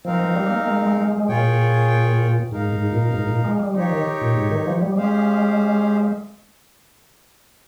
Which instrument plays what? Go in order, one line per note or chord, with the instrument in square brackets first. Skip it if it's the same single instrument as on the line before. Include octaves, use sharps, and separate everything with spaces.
[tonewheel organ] F3 [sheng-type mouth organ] C4 D#4 A#4 F5
[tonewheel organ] F3
G3
A#3
G#3
G#3
G#3
G#3
[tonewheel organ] A#2 [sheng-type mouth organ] F4 G#4 C#5 G5
[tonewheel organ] G#2 [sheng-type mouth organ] D#4 A#4 F5
[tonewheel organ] G#2
A#2
G#2
A#2
G#3
G3
[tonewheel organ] F3 [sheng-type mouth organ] D#4 G4 C#5
[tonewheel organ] D#3
A#2
G#2
D#3
F3
G3
[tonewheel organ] G#3 [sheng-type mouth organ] C#4 G4 C5 F5